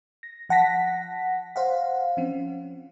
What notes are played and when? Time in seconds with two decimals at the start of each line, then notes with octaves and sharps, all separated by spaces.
0.23 A#6
0.49 F3 F#5 A5 A#6 B6
1.56 C5 F5 F#5
2.17 F3 C4 C#4